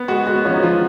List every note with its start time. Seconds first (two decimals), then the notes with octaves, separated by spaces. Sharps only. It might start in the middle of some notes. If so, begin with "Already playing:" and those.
Already playing: B3
0.08 G#3 F#4
0.27 G#3 F#4
0.36 B3
0.45 F3 C#4
0.54 D#4
0.63 F3 F4